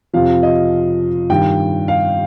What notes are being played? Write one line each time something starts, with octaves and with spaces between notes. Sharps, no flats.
F2 C3 F3 F5
D#5
G2 D#3 G5
F5